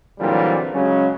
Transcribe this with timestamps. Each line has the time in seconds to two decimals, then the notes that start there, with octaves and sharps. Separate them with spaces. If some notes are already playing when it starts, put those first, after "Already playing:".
0.19 A#2 D3 E3 F#3 G3 C4
0.73 C#3 F#3 G#3 C#4